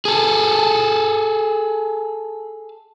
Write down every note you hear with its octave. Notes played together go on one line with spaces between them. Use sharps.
G#4 A4